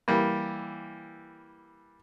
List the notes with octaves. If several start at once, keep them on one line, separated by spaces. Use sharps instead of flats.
E3 G3 A#3